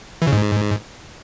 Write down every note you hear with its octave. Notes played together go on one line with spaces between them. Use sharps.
E3
C#3
G#2